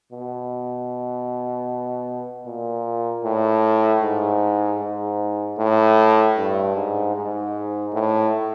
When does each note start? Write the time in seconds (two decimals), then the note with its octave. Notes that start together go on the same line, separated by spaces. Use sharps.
0.12 B2
2.46 A#2
3.24 A2
4.02 G#2
4.80 G#2
5.58 A2
6.37 G2
6.75 G#2
7.15 G#2
7.93 A2